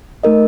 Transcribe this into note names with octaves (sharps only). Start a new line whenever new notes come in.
A3 D#4 A#4 D#5